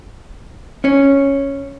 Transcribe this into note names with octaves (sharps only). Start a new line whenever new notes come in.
C#4 C#5